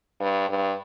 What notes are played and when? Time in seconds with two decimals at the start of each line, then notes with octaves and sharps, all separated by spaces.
0.20 G2
0.49 G2